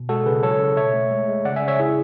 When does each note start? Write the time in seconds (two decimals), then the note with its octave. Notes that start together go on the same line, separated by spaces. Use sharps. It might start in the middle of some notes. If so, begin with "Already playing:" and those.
Already playing: B2
0.09 G#3 F#4 A4
0.26 C#3 G#4 B4
0.43 F#3 A4 C#5
0.59 C#3
0.77 B2 C#5 E5
0.94 A3
1.11 G#3
1.28 G#3
1.45 C#3 D5 F#5
1.56 E5 G#5
1.62 C#3
1.68 C#5 E5
1.79 C#3 E4 G#4